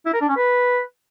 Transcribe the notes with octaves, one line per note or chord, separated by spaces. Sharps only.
E4
A#4
D4
C#4
B4